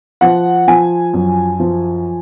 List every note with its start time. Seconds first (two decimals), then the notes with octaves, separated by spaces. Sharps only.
0.21 F3 F#5
0.68 F3 G#5
1.14 F#2
1.60 F3